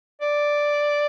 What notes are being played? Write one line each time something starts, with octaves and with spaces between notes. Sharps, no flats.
D5